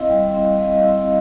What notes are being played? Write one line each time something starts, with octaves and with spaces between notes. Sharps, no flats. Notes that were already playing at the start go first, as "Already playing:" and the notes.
Already playing: C4 E4 D#5 F5
G3
C4 E4
G3 D#5 F5
C4 E4